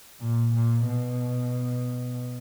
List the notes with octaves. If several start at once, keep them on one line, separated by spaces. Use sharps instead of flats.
A#2
A#2
B2